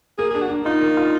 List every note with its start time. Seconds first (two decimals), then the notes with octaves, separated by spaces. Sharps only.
0.18 A#3 G#4
0.30 G#4
0.35 D4
0.41 F#4
0.49 D4
0.65 D#4 F4
0.81 A#3
0.97 F4